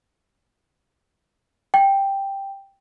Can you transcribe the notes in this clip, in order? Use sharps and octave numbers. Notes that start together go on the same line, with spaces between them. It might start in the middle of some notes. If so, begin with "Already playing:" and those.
G5